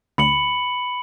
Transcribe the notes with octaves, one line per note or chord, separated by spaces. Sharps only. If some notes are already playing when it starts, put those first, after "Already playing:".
D2 B5 C#7 F#7